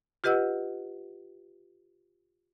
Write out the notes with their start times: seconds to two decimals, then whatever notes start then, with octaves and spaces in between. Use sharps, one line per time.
0.24 F4 G4 B4 D#5 F#5 E6